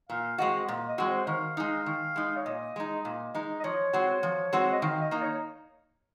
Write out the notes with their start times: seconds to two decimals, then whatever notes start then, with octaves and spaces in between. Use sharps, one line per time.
0.09 A#2 F5
0.38 G#3 C4 F#4 D#5
0.68 A#2
0.88 D#5
0.98 G#3 C4 F#4
1.08 C5
1.27 D#3 F5
1.57 G#3 D#4
1.86 D#3
2.16 G#3 D#4
2.36 C#5
2.46 A#2 D#5
2.76 G#3 D#4
3.05 A#2
3.35 G#3 D#4
3.60 D#5
3.64 F3 C#5
3.93 G#3 C4 F#4
4.23 F3
4.53 G#3 C4 F#4
4.72 D#5
4.82 D#3 F5
5.01 D#5
5.11 A#3 D#4
5.22 C#5